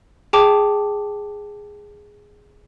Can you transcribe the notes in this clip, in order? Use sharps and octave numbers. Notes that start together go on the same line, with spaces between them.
G#4 G5 A5 D6